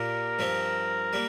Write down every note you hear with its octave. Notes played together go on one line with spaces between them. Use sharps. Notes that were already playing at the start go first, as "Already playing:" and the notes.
Already playing: A#2 A#3 G4 A#4
G2 F3 C4
G3 A#3